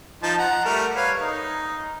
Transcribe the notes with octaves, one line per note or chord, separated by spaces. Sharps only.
F3 D#4 A5
F#5 A#5
G3 A3 A#4
B4 C#5 F5
D#4